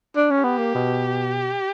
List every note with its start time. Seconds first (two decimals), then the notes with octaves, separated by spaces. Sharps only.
0.16 D4
0.31 C#4
0.41 B3 G4
0.58 A#3
0.75 B2